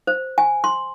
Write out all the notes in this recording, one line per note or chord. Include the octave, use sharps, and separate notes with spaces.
C5
G#5
C6